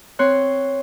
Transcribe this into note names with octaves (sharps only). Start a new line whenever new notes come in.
C4 C#5 C6 F#6